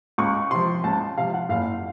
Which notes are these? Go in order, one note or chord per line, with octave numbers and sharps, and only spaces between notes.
C#2 C#6
C3 F3 C6
C#2 A5
C3 F3 F5
F#5
F#1 F5